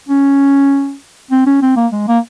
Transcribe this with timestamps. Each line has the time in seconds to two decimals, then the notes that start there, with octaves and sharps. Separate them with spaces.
0.08 C#4
1.31 C4
1.46 C#4
1.62 C4
1.76 A#3
1.92 G#3
2.08 A#3